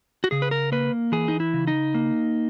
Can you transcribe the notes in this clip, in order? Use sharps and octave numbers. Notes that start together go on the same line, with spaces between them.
F#4
C#3 G#4
B4
A#4
A#3 B4
E3 G#4
D#4
E4
C#3
D#4
A#3